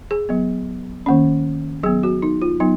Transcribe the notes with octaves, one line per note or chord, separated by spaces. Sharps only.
G#4
F#3 B3
D#3 A#3 C#4
F#3 B3 G#4
F#4
D#4
F4
F#3 B3 D#4